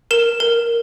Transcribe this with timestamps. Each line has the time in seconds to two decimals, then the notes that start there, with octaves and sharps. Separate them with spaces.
0.11 A#4 E7
0.40 A#4